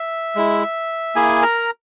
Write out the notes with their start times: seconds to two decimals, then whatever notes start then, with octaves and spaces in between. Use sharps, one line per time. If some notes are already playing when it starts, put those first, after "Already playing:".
Already playing: E5
0.35 G#3 E4
1.15 A#3 E4 G#4 G#5
1.42 A#4 A#5